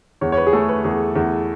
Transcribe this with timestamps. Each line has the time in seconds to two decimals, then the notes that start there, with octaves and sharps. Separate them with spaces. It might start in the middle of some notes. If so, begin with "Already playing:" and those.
0.21 E2 C#5
0.32 C#5
0.37 B4
0.47 G#4
0.53 A3 A4
0.69 B4
0.84 E2 G#4
1.16 E2